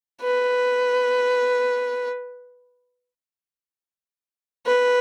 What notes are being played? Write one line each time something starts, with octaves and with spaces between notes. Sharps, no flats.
B4
B4